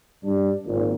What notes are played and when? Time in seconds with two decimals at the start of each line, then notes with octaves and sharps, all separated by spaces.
0.24 G2 D4
0.66 G#1 A#2